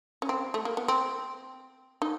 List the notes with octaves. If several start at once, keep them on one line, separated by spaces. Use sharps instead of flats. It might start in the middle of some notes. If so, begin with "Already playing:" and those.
C#4
C4
A3
A#3
B3
C4
D#4